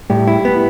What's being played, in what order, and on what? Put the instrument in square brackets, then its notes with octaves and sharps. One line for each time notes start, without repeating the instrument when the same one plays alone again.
[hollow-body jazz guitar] A2 [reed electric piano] G3 G4
[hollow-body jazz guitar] E4
B3